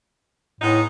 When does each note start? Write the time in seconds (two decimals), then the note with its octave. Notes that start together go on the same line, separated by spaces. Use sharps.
0.60 A2 G#3 B3 D#4